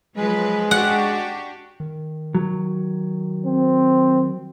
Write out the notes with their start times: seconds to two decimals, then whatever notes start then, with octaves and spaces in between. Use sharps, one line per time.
0.17 F3 F#3 G#3 B4
0.71 D4 F#4 G4 F#5
1.80 D#3
2.35 F#3
3.46 C4